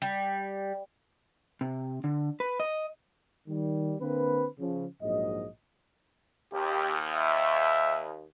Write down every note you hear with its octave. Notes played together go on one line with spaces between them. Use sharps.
G3
C3
D3
B4
D#5
D#3 G3
D3 A#3 C4 B4
C#3 F3
A#1 G#2 F#3 D#5
D#2 G4
E5